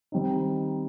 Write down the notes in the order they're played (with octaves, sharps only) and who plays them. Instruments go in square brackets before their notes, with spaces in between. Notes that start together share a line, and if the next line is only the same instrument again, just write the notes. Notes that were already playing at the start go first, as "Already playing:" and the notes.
[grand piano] D#3 G3 C4 D#4